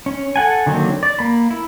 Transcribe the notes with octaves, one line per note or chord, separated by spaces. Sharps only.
C#4
A4 F#5 G#5
D3 D#3 F#3 A#3 C4
D5
A#3 B5
E4